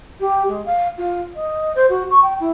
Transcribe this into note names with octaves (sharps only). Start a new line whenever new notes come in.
G4
G#3
F5
F4
D#5
C5
F#4
C#6
G5
E4